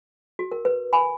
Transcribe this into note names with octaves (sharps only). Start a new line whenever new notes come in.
F#4
A#4
B4
G#5 B5